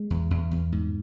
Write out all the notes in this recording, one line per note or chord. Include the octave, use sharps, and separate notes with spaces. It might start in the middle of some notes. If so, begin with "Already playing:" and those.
Already playing: G#3
E2
E2
E2
G#2